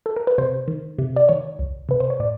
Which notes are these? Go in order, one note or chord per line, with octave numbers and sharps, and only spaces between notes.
A4
A#4
B4
C3 C5
D#3
C3
D5
D#3 C#5
C2
C3 B4
C5
C#5
A2 D5